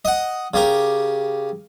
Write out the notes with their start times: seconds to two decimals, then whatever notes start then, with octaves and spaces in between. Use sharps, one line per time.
0.05 D#5 F#5
0.54 C#3 G4 A#4